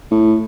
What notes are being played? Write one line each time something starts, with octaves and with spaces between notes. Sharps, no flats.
A2